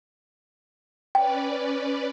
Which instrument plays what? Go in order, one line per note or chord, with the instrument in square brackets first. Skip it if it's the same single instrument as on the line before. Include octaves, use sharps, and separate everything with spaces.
[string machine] C#4 B4 D5 [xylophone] G5